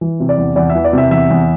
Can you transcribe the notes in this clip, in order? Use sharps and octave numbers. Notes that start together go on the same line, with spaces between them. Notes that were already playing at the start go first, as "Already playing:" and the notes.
E3
C3
D5
E2
E2 D5
E5
E3
D5
C3 E5
E2 E5
E2